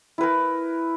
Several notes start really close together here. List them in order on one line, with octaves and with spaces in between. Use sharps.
E4 B4 A#4